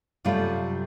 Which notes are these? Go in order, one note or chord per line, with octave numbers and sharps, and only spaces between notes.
F#2 C3 G3 A3 F4 A4